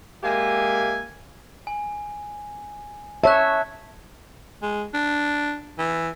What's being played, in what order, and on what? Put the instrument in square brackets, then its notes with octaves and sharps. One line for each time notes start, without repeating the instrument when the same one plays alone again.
[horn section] G#3 A#3 G4 E5 G#5
[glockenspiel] G#5
[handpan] C#5 E5 [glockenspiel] A5 F#6
[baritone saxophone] G#3
D4
E3